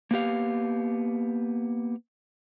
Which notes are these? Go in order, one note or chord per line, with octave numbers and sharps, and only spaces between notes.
A#3 B3 G4 F5